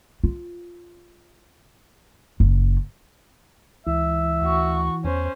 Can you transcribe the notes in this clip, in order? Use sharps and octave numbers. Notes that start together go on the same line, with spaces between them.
F4
F#1
C#2 E3 E5
D2 F#4 C#6
E2 C#4 C5